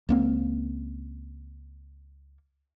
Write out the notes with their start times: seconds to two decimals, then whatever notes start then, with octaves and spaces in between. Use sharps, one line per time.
0.09 C#2 A#3 C4